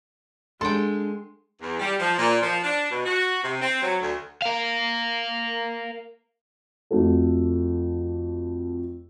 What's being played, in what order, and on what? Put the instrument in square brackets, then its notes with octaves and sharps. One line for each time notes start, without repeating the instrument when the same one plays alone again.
[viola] G#3 [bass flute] D4 [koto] A4 F#5 G5 [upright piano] C6
[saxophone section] E2
G3
F3
A#2
F3
D4
B2
F#4
C3
C4
F#3
D2
[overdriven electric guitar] A#4 F5
[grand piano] F2 A3 F#4 A4